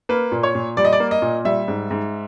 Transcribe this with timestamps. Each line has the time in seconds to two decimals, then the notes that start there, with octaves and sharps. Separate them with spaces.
0.09 A#3 B4
0.32 A#2
0.43 C#5
0.55 A#2
0.77 G3 D5
0.85 D#5
0.93 D5
1.00 A#3
1.11 D#5
1.22 A#2
1.45 G3 E5
1.68 G#2
1.91 G#2